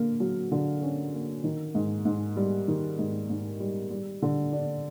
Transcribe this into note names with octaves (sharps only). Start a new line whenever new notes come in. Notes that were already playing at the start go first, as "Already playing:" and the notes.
Already playing: D3 A#3
F#3
D3
C#4
A#3
D#3
G#2
G#2
G3
D#3
G#2
G#2
G3
G3
D3
D4